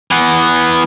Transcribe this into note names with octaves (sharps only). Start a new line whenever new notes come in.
E3 B3